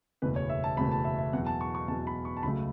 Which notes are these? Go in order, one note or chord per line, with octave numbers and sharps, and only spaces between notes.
F#1 E2 B2 A3 B4
C#5
E5
A5
F#1 E2 B2 A3 B5
A5
E5
E5
E2 B2 F#3 F#5
A5
C#6
C#6
E2 B2 F#3 A5
B5
C#6
A5
C#2 C#3 F#3 A3 B5